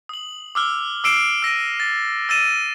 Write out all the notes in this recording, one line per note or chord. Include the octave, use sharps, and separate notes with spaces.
D#6 F#7
D6 E6 F6
D6 E6 C7 D7 E7
E6 A#6 D7 D#7
A6
E6 A6 D#7 E7